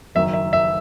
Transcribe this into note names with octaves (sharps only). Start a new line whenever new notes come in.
F#1 F#2 D#3 E5
E5
E5